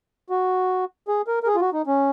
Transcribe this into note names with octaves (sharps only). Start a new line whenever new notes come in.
F#4
G#4
A#4
A#4
G#4
F4
F#4
D#4
C#4